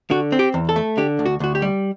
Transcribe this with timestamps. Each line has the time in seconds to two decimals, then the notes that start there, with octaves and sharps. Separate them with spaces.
0.10 D3 F#4
0.32 C4
0.39 G4
0.54 E2
0.69 A4
0.76 A3
0.98 D3 G4
1.19 D2
1.26 F#4
1.40 D2 F#4
1.55 G4
1.62 G3